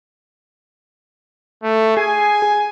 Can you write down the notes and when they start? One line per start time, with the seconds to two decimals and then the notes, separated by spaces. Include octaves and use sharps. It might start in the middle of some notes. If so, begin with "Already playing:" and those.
1.63 A3
1.97 G#4 G#5